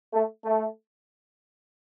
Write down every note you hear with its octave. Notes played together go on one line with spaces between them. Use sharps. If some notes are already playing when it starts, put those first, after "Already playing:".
A3
A3